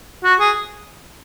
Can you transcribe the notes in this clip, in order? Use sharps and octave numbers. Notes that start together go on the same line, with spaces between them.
F#4
G#4